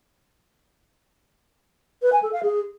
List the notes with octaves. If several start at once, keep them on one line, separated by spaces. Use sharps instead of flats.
B4
G#5
A4
F5
G#4